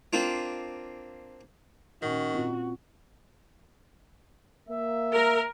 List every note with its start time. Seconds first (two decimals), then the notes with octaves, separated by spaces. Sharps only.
0.13 A#3 C4 D4 F4
2.02 A#2 D#3 C#4 F#4
2.34 A#2 C4 F4
4.68 A#3 E5
5.14 A#4